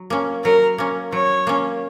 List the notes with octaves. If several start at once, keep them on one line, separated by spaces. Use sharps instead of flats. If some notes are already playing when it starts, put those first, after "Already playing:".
Already playing: F#3
A#3 C#4
F#3 A#4
A#3 C#4
F#3 C#5
A#3 C#4